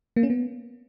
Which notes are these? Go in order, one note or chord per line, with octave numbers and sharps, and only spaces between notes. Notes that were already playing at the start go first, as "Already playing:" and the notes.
A#3
C#4
B3